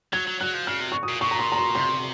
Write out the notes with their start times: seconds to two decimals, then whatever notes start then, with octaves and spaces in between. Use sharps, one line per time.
0.13 F#3 G#6
0.27 F#3
0.40 F#3 F#6
0.54 F3
0.67 C#3 F6
0.80 C3
0.92 C#6
1.03 D#6
1.08 A#2
1.21 A#2 C#6
1.31 A#5
1.39 C6
1.52 A#5
1.57 C6
1.75 C3 C6